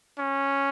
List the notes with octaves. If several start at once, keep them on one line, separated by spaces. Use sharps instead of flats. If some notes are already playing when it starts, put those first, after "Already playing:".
C#4